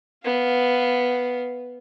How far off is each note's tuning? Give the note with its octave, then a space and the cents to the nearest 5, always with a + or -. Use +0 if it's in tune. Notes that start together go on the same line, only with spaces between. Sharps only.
B3 +0 F5 +0